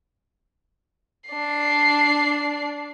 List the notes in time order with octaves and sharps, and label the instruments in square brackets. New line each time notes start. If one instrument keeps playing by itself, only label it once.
[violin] D4 C7